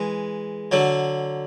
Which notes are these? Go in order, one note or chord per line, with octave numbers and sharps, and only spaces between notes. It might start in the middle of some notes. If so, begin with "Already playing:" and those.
Already playing: E3 G#3
D3 F#3